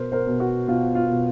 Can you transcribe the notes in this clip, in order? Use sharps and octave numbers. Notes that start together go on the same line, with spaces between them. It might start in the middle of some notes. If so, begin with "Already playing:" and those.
Already playing: B2 A#4 C5
A#4 C5
B2
F#4
B2 F4
F4
B2